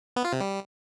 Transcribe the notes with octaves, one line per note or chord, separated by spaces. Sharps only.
B3
F4
C3
G3